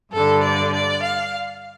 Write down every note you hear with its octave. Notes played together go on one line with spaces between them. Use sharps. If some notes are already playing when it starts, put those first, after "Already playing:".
G2 D3 A4
D5
D5
F5